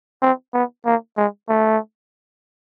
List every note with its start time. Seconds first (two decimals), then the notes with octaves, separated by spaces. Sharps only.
0.22 C4
0.53 B3
0.86 A#3
1.17 G#3
1.49 A3